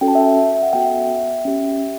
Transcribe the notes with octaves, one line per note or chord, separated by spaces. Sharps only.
C#4 F#4 A4 G5
A5
E5 G5
E5
F#5
B3 F#4 A4 E5 G5
C#4 G4